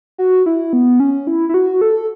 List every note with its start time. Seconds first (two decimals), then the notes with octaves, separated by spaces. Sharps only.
0.18 F#4
0.46 E4
0.73 B3
1.00 C#4
1.27 E4
1.49 E4
1.54 F#4
1.81 A4